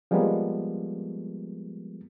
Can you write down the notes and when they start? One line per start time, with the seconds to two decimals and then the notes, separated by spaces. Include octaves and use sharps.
0.11 F3 G3 G#3 A#3 B3